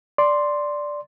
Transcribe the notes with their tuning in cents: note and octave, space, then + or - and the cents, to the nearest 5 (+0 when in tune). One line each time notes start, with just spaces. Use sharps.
D5 +0 C6 +0